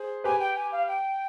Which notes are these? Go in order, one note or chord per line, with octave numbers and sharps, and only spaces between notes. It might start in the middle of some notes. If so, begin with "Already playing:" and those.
Already playing: G#4 C5
G4 B4 G#5
G5
G#5
F5
G5